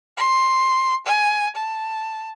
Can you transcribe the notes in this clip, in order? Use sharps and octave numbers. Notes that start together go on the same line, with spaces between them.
C6
G#5
A5